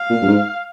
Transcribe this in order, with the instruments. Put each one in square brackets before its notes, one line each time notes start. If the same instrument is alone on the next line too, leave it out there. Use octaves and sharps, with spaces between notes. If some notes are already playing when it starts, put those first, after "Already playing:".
Already playing: [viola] F5
[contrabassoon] A#2
G2
G#2